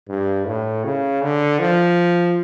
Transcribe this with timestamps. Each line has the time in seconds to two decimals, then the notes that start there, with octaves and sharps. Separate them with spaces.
0.09 G2
0.47 A2
0.84 C#3
1.22 D3
1.59 F3